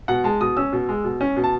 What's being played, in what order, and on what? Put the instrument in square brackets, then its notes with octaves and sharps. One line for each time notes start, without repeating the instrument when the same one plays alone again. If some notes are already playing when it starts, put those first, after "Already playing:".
[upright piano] B2 F#5
G#3 A5
B2 D#6
C#4 E6
B2
G#3
B2
C#4
B2
A5